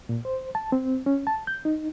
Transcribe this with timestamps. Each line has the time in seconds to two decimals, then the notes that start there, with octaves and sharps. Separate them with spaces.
0.09 A#2
0.25 C5
0.55 A5
0.72 C4
1.06 C#4
1.27 A5
1.47 G6
1.65 D#4